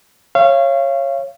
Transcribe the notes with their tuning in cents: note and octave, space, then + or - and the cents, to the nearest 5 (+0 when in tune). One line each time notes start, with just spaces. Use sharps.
C#5 -15 F5 -30